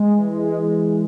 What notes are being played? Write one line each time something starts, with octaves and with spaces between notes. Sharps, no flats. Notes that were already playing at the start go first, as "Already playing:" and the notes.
Already playing: G#3
E3
G#3
E3